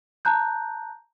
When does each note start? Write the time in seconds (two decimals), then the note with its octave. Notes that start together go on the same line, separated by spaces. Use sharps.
0.25 A5 A#5 F#6 G6